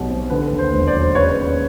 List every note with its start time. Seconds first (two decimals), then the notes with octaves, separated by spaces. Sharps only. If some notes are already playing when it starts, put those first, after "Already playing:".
Already playing: B1 B2 G3
0.09 C4
0.30 D3 B4
0.51 D#2
0.58 C5
0.73 E1
0.87 C5 D5
0.93 F#3
1.15 C#3 B4 C#5
1.36 D#2